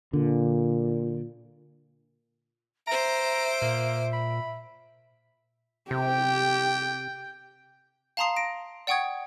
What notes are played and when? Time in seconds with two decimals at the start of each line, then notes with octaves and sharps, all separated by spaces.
0.13 A#2 D3
2.87 C5 E5 A#5 D7
3.62 A#2 A#3
4.13 B5
5.91 C3 G4 G5
8.17 F5 A5 A#5 C6 D#6 C7
8.36 A#6 D7
8.87 D5 F#5 G5 C#6 D#6 G#6